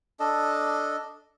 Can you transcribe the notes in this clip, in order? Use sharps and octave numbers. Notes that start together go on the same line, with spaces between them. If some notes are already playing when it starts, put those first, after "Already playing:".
D4 A4 D#5